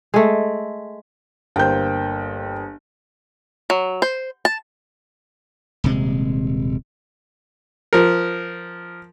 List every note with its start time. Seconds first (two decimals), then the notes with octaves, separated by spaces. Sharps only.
0.14 G#3 A3
1.56 G1 A#3 C5 G5 G6
3.70 F#3
4.02 C5
4.45 A5
5.84 D#1 C3 G#3
7.93 F3 A#4